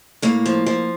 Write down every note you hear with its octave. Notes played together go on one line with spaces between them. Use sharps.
A2 A#3
F3
F3